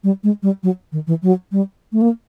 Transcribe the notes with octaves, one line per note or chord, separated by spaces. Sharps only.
G3
G#3
G3
F#3
D#3
E3
F#3
G3
A3
A#3